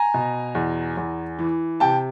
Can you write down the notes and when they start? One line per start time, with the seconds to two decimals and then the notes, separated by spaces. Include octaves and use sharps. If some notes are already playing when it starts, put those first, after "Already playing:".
Already playing: G#5 A#5
0.14 B2
0.55 E2
0.97 E2
1.39 E3
1.80 C3 G5 A5